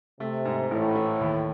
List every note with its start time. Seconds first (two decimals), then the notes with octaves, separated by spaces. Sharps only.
0.20 C3 A3
0.45 G#2
0.71 A1 A2
0.95 E3
1.21 D#2